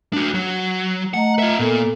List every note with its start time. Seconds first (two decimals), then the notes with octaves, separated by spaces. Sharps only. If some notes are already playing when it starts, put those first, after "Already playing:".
0.13 D4 F#4
0.34 F#3
1.14 A3 D#5 F#5 A#5
1.39 F4 E5
1.59 A#2 B3 A4